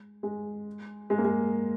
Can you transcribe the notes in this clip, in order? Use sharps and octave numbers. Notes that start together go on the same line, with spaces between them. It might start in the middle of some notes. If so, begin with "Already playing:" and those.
Already playing: G#3
G#3
G#3
A#3
G#3